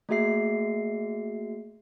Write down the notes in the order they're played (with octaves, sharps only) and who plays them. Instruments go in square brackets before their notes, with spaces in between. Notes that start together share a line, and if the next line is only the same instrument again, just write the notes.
[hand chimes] A3 A#3 F#4 G#4 E5 C7